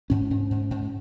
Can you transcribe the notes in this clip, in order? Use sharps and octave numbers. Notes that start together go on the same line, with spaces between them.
G#2 C#4
G#2
G#2
G#2